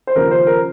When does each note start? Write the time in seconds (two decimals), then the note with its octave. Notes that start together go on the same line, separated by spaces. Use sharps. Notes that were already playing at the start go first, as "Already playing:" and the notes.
0.07 C5
0.15 D#2 C#3 F3 A#4
0.31 C5
0.47 A#4